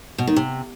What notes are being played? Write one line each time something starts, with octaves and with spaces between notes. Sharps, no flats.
B2
D#3
C3